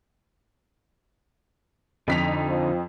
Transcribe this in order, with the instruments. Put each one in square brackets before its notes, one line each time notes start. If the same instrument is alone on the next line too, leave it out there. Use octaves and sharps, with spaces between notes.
[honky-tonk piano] F2 B6 F7 [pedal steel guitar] D3 D#4
[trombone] F3